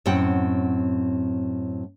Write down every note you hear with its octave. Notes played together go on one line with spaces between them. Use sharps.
F#2 A2 C4 F#5 G5